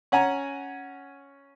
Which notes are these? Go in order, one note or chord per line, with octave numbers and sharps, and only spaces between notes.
C#4 F#5 G#5 A#5